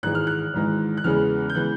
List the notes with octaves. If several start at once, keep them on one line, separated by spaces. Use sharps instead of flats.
G#1 G#2 E3 G#3 F#6
F6
F#6
G#1 G#2 E3 G#3
F#6
E2 C#3 E3 G#3 B3 F6
G6
C#3 E3 G#3 B3 F#6